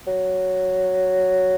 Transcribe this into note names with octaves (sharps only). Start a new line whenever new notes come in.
F#3